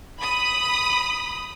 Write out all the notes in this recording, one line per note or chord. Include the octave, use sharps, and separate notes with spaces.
B5 D#6